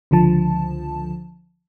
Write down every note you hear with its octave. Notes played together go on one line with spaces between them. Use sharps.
C#2 D3 F3 A5